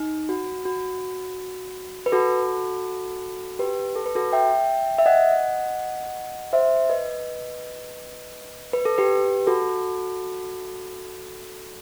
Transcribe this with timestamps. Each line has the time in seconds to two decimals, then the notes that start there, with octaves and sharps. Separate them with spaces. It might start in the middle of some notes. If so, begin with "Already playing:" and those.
Already playing: D#4
0.29 F#4
0.65 F#4
2.06 B4
2.12 F#4 A4
3.59 G4 B4
3.96 A4
4.06 B4
4.15 F#4 A4
4.33 E5 G5
4.98 E5
5.06 D#5 F#5
6.53 C5 E5
6.89 B4 D#5
8.73 B4
8.85 A4
8.98 G4 B4
9.47 F#4 A4